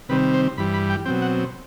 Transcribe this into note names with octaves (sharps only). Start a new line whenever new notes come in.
C3 D#3 G3 C4 B4
C5
G2 E3 G3 B5
B5
G5
B2 F#3 C4 G5
F#5